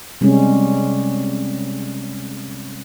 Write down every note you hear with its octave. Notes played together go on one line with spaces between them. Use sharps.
C3 G3 G#3 C#4